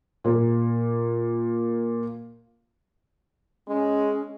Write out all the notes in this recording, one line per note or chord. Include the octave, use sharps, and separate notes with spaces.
A#2 A#3
G#3 C#4